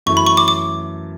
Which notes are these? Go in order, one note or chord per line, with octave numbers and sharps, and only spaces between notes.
F#2 E3 A3 C#6
B5
C#6
D6
D6